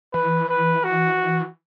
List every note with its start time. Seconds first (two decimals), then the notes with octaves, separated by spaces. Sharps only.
0.13 E3 B4
0.49 B4
0.84 F#4